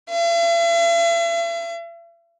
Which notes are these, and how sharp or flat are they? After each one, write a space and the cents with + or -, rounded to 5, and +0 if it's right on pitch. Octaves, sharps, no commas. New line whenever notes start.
E5 +45